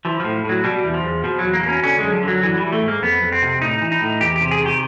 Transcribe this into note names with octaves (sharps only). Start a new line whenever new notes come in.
E3 F3
A2 F3
A2 F#3
B2 G3
E2
F3
E2
B2 F3
E2 F#3
A#3
B2
C#4
D3 C#4
F#2 G#3
F3
D3 F#3
E3 F#3
G3
E3
A3
G#2
A#3
F2 B3
F2
C4
C3
A2 D#4
E3
D#4
A2
E2 G4
G4
C3
G#4
D#3 G4